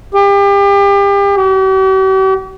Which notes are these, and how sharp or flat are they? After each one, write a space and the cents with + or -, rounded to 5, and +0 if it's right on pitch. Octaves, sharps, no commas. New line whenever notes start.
G4 +35
G4 -45